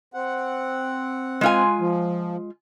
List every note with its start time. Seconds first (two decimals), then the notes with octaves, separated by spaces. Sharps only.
0.14 C4 F#5
1.41 G#3 F4 G#5
1.80 F3